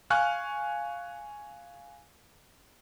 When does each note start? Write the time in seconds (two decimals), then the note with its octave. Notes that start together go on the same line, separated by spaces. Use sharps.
0.10 F5 G#5 C#6 F6 F#6